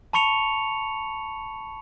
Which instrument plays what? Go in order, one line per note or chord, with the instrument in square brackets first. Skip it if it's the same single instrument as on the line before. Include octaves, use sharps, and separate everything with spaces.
[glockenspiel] A5 B5 C#6 C#7 F7